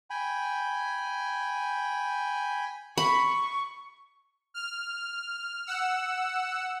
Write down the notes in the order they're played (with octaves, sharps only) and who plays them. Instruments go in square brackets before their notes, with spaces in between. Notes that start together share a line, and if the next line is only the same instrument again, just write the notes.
[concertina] G5 G#5 B5
[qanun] B5 [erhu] C#6
[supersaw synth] F6
F#5 E6